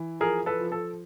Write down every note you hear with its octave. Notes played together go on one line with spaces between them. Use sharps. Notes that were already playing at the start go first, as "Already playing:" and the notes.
Already playing: E3
F3 G#4 A#4
A4 B4
F3
A4